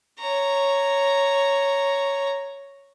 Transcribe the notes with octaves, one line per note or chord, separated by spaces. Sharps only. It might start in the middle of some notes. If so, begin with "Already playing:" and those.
C#5 A#5